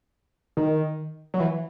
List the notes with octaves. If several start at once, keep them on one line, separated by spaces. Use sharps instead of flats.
D#3
F#3
E3